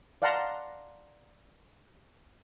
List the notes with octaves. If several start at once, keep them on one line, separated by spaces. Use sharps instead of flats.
D5 F5 F#5 A5 A#5 C6